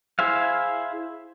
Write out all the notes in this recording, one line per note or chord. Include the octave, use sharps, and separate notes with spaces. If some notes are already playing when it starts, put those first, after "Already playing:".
E4 G#4 C5 E5 F5